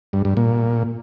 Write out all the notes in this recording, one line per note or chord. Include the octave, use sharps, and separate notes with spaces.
G2
G2
A#2